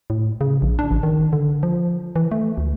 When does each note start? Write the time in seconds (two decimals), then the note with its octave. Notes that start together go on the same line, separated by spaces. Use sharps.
0.10 A2
0.41 C#3
0.62 A#1
0.79 D4
0.91 A1
1.03 D#3
1.33 D3
1.63 F3
2.16 E3
2.31 A3
2.58 D2